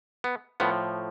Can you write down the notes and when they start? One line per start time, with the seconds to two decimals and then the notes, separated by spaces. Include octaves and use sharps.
0.24 B3
0.60 A2 F3 B3